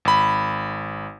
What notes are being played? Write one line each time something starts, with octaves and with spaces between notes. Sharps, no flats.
G#1 B5